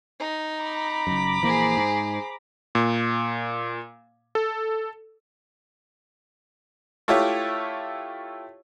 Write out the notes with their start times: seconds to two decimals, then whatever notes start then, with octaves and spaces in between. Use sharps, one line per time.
0.20 D#4
0.62 A#5 B5 D6
1.07 F#1 F#2
1.42 A#1 E3 A#3 G#4 C5
1.77 G#2
2.75 A#2
4.35 A4
7.08 A3 E4 F4 G4 C#5